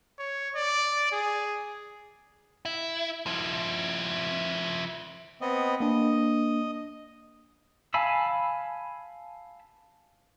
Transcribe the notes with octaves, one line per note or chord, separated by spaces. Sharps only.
C#5
D5
G#4
E4
F3 E4
B3 C4 D#5
A#3 D4 D#5
F5 G#5 A5 B5 E6